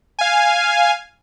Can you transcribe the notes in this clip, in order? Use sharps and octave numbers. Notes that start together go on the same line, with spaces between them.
F5 G#5